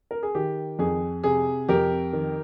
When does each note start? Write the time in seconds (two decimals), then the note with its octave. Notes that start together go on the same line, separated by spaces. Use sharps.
0.11 A#4
0.23 G#4
0.35 D#3 G4
0.79 F2 G#4
1.24 C3 G#4
1.69 F2 G4 A#4
2.13 D#3